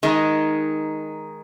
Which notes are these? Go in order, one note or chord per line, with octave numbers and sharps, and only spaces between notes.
D#3 G#3 D#4